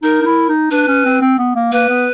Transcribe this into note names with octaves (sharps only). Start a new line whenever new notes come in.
D#4 A#4
D#4
E4
D#4
D4 B4
C#4
C4
C4
B3
A#3
A#3 B4
B3